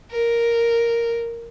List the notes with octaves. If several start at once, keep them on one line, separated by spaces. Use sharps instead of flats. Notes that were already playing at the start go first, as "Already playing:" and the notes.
A#4